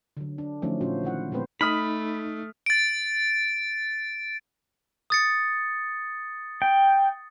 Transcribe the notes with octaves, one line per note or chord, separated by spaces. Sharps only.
D3 F#3
D4
D3 F3 F#3 A3 C#4 D#4
A#2 C#4 F4 F#4 C5
D#3 E4 F#5
A#2 G#3 B3 C4 B4 C5
A3 D#4 B5 D#6 F6 B6
A6 D7
D#6 A6 C#7
G5